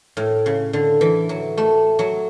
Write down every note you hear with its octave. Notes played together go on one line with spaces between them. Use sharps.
A2
C#3
D3
E3
F#3
A3
F#3